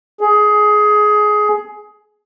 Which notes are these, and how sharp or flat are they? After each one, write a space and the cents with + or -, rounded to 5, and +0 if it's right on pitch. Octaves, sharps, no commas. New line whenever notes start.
G#4 +15